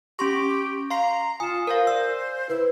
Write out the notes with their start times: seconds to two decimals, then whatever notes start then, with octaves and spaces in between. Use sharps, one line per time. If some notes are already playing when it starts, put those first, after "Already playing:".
0.19 C#4 G4 C6 C#6 A#6
0.90 F5 A#5 C6 C7
1.40 F4 G#5 D#6 E7
1.67 A#4 C5 F5
1.87 D5 E6
2.49 E4 B4 C5